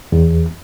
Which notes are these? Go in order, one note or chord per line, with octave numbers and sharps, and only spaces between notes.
E2